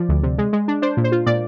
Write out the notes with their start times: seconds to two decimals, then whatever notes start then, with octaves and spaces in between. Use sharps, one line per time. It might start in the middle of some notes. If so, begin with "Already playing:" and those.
Already playing: F3 D5
0.09 D2
0.23 C3
0.38 G#3
0.53 G#3
0.68 D4
0.82 D4 C5
0.97 A#2
1.04 C5
1.12 F4
1.26 A#2 D5